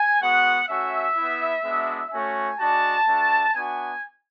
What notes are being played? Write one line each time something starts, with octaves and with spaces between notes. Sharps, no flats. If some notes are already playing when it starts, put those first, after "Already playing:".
Already playing: G#5
G#3 B3 F#4 F#5
A3 C#4 F#4 E5
B3 E4
G#3 B3 D4 F#4
A3 C#4 F#4 G#5
G#3 D4 F#4 A5
A3 D4 F#4
B3 D4 F#4 G#5